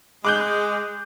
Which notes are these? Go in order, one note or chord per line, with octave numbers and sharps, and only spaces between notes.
G#3 D6 F#6 G6